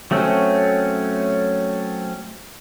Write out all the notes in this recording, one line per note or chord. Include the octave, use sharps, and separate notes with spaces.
F#3 A3 C4 C#4